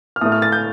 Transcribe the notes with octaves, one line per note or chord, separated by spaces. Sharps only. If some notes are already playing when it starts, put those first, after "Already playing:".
F6
A2 A3 D#6
F6
A6
G6